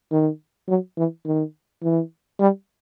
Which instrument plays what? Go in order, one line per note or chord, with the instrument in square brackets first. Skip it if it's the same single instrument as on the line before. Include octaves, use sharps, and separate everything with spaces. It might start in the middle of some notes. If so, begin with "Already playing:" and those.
[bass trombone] D#3
F#3
E3
D#3
E3
G3